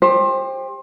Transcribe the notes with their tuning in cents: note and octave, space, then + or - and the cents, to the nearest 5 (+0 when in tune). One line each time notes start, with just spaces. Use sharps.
G4 +25 C5 +25